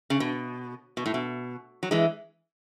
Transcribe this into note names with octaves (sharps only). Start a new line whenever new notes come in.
C#3
B2
B2
A2
B2
F#3
E3 G#3